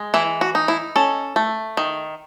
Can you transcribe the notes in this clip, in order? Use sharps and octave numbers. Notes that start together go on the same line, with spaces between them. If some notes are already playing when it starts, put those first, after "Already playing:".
Already playing: G#3
E3 E4
F#4
D#4
E4
C#4 A4
A3
D#3